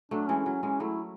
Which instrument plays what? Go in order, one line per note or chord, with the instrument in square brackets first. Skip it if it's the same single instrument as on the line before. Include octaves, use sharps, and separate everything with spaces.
[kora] F#3 A3 [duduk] D4
[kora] E3 G#3 [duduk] C#4
[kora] F#3 [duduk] C#4
[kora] E3 G#3 [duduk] C#4
[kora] F#3 A3 [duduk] E4